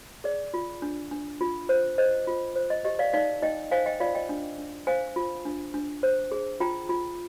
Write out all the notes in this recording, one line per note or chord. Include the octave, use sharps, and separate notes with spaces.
G#4 D5
F4
D4
D4
F4
C5
C5 D#5
F4
C5
D#5
G4 D#5
D5 F5
D#4 D5 F5
D#4 D#5 G5
C5 F5 G#5
D#5 G5
F4 D5 F5
D#5 G5
D4
D4
C5 F5 G#5
F4
D4
D4
C5
G#4
F4 G5 A#5
F4